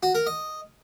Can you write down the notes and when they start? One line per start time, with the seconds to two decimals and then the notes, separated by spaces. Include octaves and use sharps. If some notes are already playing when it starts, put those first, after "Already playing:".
0.03 F#4
0.15 A#4
0.27 D#5